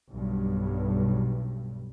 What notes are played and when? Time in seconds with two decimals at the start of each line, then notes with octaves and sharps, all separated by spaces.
0.11 B1 G2